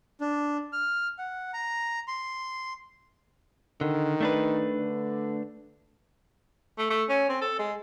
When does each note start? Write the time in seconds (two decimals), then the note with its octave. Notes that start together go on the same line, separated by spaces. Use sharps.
0.21 D4
0.73 F6
1.19 F#5
1.54 A#5
2.08 C6
3.81 D3 D#3
4.20 A3 D4 B4
4.76 D3
6.78 A3
6.90 A3
7.09 C#4
7.29 C4
7.41 A4
7.59 G#3